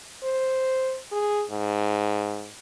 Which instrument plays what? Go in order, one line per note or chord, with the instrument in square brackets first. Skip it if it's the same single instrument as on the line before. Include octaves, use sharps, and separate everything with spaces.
[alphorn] C5
G#4
G#2